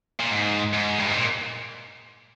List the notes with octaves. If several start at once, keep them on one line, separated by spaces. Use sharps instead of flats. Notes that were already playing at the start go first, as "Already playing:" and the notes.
A#2
G#2
G#2
G2
G#2
A#2